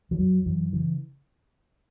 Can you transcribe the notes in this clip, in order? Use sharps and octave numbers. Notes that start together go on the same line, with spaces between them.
E3
F#2 F#3
F#2 E3
C#3 E3